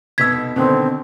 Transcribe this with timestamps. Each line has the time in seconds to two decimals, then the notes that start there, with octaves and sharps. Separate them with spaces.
0.18 F1 B2 E6 G#6 B6
0.56 B2 D3 D#3 C4